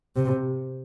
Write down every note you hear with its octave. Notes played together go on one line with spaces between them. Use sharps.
C3